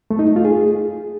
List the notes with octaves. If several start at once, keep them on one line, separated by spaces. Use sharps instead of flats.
A3
D#4
A3
F4
G#4